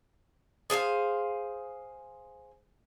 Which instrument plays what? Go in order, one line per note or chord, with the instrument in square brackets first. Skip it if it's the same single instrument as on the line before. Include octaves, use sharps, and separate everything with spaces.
[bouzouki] G#4 C5 E5 F5